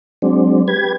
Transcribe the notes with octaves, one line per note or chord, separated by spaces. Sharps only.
F#3 G#3 C4 D4
G4 B4 G#6